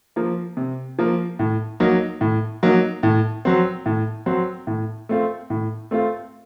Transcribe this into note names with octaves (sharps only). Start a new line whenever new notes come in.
F3 A#3
C3
F3 A#3
A2
F#3 A#3 D#4
A2
F#3 A#3 D#4
A2
F#3 C4
A2
F#3 C4
A2
A3 C4 F4
A2
A3 C4 F4